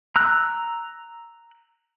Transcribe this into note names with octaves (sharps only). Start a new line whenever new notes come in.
A#5 E6 F#6